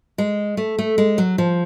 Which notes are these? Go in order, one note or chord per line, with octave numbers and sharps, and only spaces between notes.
G#3
A3
A3
G#3
F#3
F3